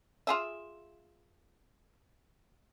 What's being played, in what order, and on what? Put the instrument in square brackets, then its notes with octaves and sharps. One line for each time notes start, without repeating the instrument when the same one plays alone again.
[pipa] F4 G#4 E5